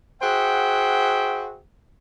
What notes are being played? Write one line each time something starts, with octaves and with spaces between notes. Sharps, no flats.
F#4 G#4 C5 E5 F#5 G5